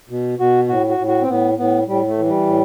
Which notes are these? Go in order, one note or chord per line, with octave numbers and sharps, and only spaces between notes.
B2
B2 F#4
A2 F#4
F#4
A2
F#4
C4
A2 B3
A2 B3
A2 G3
A3
E3
G3
A2